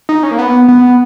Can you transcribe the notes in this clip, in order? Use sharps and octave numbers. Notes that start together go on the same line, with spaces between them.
D#4
C#4
A#3
B3
B3